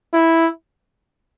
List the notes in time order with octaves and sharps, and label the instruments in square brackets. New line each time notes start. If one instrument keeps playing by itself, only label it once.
[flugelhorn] E4